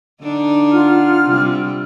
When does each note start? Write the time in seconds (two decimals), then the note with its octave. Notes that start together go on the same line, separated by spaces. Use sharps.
0.22 D3 D4 D#4
0.71 F4 F#5 F6
1.24 C3 G3 C4